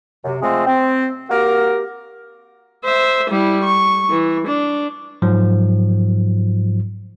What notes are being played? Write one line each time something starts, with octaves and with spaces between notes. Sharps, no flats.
F#2 C3
F3 G#3 A3 C4
C4
A#3 F#4 G4 A#4
C5 E5
G3 E4
C#6
E3
D4
G#2 F3 F#3